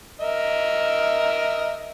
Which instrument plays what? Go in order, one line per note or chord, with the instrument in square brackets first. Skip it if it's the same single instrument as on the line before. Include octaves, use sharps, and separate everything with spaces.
[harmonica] A#4 D#5 E5